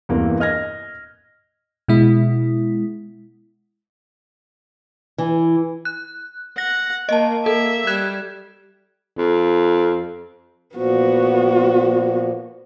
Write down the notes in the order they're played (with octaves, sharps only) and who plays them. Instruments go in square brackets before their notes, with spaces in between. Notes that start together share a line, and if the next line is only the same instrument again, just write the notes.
[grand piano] E2 G2 C3 E3 A#3
D#5 F6 G#6 A#6
[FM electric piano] B2 G#3 E4
[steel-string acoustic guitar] E3
[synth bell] F#6
[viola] F#5 [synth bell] A#6
[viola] A#3 [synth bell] D#5 A5
[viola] A#3 E5 [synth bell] A4
[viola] G3 [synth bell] F#6 G#6 E7
[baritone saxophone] F2
[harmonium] A#2 F3 [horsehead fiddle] B3 F#4